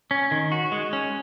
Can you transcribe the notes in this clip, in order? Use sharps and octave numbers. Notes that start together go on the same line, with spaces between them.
C#4
D#3
F#4
G#3
C#4